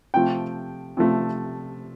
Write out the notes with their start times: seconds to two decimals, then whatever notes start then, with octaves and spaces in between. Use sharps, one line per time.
0.14 C3 F3 A3 G5
0.97 C3 F3 A3